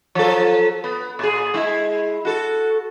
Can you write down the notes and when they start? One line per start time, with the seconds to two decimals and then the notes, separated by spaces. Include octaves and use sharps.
0.15 F3 F#3 A4
0.84 B3
1.19 A#2 G#4
1.54 G#3 E4
2.25 F#4 A4